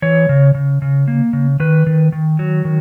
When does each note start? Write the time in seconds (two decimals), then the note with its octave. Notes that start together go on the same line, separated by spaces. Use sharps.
0.02 E3 C#5
0.29 C#3
0.55 C#3
0.82 C#3
1.08 A#3
1.33 C#3
1.60 D#3 B4
1.87 D#3
2.12 D#3
2.39 F#3
2.65 D#3